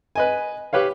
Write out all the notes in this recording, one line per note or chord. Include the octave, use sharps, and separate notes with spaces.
B4 D#5 G#5
G4 B4 C#5 F5